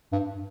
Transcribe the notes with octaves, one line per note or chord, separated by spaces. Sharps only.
G2